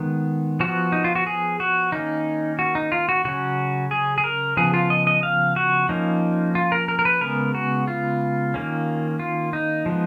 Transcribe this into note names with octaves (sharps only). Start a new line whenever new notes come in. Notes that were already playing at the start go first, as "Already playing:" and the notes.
Already playing: D#3 G#3 B3
F3 B3 F#4
D#4
F4
F#4
G#4
F#4
D#3 A#3 C#4 D#4
F#4
D#4
F4
F#4
C#3 F#3 C#4 F#4
G#4
G#4
A#4
C#3 F3 B3 G#4
F4
D#5
D#5
F5
F#4
F3 A#3 C#4 D#4
F4
A#4
A#4
A#4
B4
C#3 G#3 B3 A#4
F#4
F4
D#3 A#3 C#4
F4
D#4
F3 G#3 B3